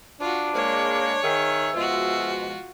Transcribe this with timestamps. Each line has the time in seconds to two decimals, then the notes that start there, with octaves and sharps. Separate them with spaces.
0.21 D4 F4 F#4
0.55 G#3 A#3 C#5
1.23 D#3 G#4 E5
1.76 B2 F3 G#3 F4 F#4